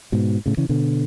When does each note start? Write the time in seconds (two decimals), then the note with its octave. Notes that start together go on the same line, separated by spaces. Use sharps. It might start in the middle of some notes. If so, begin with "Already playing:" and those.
0.12 G#2 B2
0.46 A2 C#3
0.57 C#3 E3
0.69 B2 D3